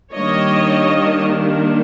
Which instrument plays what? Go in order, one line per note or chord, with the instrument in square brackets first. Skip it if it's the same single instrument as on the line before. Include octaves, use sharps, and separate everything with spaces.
[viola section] D#3 G3 A#3 D4 C#5 D#5